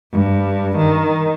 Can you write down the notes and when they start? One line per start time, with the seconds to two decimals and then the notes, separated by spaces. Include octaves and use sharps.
0.13 G2
0.78 D#3